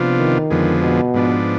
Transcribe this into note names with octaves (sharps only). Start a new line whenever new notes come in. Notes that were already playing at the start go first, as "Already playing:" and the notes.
Already playing: C3 F3 B3 D4 F4
D#3
F2 D3 F3 G#3 B3
B2
G#2 F3 B3 D4